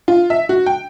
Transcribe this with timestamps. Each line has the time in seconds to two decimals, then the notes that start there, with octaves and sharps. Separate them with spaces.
0.08 F4
0.30 E5
0.49 F#4
0.66 G5